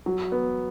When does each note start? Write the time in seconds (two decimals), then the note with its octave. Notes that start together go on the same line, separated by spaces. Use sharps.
0.06 F#3
0.32 B3